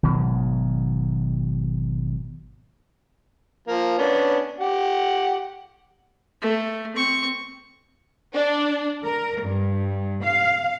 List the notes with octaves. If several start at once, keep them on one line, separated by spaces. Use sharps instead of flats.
G#1 B2 D#3 F#3
F3 A#3
B3 C#4 D4
G4 F#5
A3
C4 C#6
D4
A#4
G2
F5